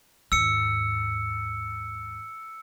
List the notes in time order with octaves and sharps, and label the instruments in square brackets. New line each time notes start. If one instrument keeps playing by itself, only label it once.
[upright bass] D#2 G#2 [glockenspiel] E6 C#7